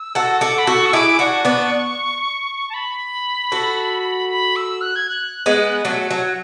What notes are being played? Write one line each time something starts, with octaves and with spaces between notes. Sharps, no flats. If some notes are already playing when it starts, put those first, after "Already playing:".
Already playing: E6
F#4 A4
F#4 A4 D6
B5
F#4 A4 C#6
E6
E4 G#4 D6
D4 F#4 C#6
B3 D4
A5
B5
F#4 A4
B5
E6
F#6
G#6
F#6
G#3 B3
F#3 A3
F#3